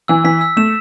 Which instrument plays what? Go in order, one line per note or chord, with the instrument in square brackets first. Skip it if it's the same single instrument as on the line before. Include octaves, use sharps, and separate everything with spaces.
[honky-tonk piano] E3 [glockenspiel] E6
[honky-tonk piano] E3 [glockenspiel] B6
[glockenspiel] E6
[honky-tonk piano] A3 [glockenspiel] E7